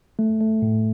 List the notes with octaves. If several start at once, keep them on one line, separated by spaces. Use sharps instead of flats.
A3
A3
A2